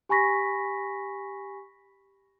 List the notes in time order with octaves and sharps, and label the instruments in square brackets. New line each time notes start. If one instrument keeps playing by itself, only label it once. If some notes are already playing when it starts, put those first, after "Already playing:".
[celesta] G4 G#5 B5 C#6 A#6 B6